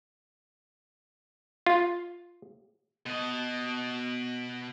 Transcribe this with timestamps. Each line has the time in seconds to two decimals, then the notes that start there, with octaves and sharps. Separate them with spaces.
1.66 F4
3.06 B2 D#5